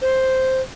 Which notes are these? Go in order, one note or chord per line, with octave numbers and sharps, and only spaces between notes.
C5